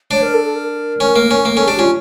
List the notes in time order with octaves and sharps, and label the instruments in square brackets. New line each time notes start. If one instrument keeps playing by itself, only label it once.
[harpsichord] D4 [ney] C#5
[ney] A#4
A4
A4
A#4
[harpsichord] C#4
A#3
C#4
[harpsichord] A#3 [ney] A#4
[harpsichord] C#4 [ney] A4
[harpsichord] D4 [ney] G4
[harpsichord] C#4 [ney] F4